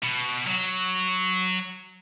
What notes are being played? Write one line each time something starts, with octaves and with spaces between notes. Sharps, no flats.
B2
F#3